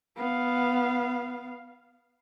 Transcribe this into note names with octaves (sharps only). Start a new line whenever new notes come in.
B3 F5